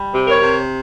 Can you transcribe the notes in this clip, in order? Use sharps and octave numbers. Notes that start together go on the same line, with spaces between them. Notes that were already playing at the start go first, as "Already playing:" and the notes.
Already playing: G3
C3
A#4 C#5
C3